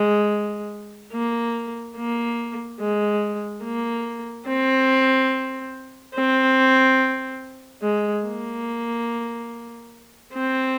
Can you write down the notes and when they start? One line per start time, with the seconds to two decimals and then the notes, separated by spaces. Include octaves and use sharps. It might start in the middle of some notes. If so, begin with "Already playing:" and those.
Already playing: G#3
1.13 A#3
1.96 A#3
2.80 G#3
3.64 A#3
4.47 C4
6.15 C4
7.82 G#3
8.25 A#3
10.34 C4